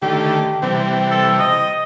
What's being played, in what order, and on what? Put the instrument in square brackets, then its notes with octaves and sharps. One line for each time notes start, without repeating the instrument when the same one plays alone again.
[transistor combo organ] D3 D#3 A3 [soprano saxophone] G4
[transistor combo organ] C3 E3 G3 [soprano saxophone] C4
[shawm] A4
D#5